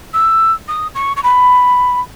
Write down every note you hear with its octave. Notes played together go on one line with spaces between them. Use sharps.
E6
D#6
C#6
C#6
B5